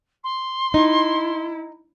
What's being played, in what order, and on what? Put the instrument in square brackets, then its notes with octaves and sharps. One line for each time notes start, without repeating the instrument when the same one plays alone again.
[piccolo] C6
[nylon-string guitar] D#4 [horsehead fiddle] E4